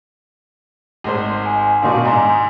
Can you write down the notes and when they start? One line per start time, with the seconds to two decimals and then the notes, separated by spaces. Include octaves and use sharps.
1.04 G#1 G#3 C5
1.46 G#5
1.83 B2 D#3 D4 F5 C6 D6
2.05 G#2 D#4 G#5 A#5 C6